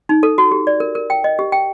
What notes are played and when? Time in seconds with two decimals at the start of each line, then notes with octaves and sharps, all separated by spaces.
0.09 D#4
0.23 A4
0.38 F#4
0.52 G4
0.67 D5
0.80 A#4
0.95 A#4
1.10 G5
1.24 D#5
1.39 G4
1.52 G5